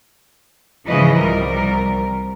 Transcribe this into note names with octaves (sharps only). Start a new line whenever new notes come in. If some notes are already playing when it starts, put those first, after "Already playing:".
G#2 C#3 E3 F3 B4 D#5
C2 G3 A#4